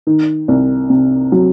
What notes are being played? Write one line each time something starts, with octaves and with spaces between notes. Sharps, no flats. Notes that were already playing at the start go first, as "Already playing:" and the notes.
D#3
C2
C3
F#3